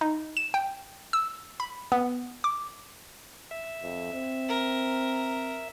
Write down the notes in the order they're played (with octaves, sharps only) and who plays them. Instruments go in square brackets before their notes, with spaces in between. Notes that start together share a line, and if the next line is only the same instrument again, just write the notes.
[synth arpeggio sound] D#4
E7
G5
E6
B5
B3
D6
[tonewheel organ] E5
[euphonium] F2
C4
[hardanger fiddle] A#4